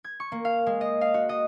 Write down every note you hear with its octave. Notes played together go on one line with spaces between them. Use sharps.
G#6
C#6
A#3
F5
G#3
D#5
F5
F#4
D#5